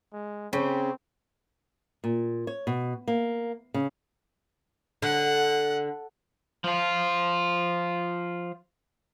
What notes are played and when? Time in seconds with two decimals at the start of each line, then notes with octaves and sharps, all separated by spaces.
0.13 G#3
0.53 C#3 C4 C#4 G5
2.04 A#2
2.47 C#5
2.67 B2
3.08 A#3
3.74 C#3
5.02 D3 F#5
6.64 F3 F4